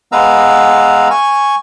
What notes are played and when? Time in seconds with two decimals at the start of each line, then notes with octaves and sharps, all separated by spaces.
0.12 G#3 B3 B4 F5 A#5 E6
1.10 G#5 C#6